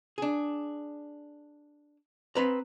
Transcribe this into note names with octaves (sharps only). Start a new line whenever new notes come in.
D4 G#4
C4 B4 A#5